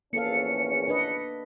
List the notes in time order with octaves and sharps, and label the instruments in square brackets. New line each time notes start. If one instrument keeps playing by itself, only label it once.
[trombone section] A#1 E2 C#4 [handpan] A#3 A4 F5 [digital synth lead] C#7
[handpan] D4 B4 D#5